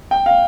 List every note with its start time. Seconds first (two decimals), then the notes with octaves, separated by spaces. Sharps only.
0.11 G5
0.26 F5